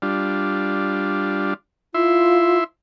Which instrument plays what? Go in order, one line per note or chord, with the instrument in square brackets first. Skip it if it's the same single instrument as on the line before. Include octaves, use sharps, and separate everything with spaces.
[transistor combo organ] G3 D4 F4
[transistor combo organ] E4 E5 C6 [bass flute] F4